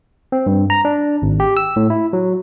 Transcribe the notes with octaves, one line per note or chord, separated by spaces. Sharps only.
C4
G2
A#5
D4
G#1
G4
E6
A2
E4
F#3